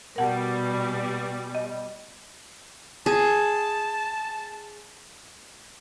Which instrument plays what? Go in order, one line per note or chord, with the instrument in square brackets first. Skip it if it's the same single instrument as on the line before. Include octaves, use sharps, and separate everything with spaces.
[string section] B2 G3 [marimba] A#4 F#5 A5
[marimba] D#5
[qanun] G#4 [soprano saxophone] A5